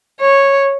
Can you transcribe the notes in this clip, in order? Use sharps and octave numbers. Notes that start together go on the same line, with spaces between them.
C#5